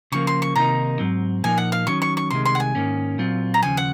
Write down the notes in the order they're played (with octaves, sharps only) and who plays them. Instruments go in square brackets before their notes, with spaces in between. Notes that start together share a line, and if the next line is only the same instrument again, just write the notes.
[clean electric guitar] C#3 F3 A#3 [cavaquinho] C#6
[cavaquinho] C6
C#6
[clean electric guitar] C3 D#3 A#3 D#4 [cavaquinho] A#5
[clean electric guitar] G#2 F#3 C4
[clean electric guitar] A#2 F3 A#3 D#4 [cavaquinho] G#5
[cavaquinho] F#5
F5
[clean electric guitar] D#3 F#3 C#4 [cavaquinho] C#6
[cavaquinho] C#6
C#6
[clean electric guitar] C2 C3 D#3 G#3 [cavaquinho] C6
[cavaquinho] C6
F#5
G#5
[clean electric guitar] G#2 D#3 A#3 C#4
A#2 F#3 C4 F4
[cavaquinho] A#5
[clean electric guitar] D#2 C#3 F3 [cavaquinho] G#5
[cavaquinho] F#5